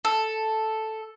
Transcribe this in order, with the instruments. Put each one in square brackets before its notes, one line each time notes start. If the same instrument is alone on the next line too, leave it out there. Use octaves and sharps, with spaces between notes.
[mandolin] A4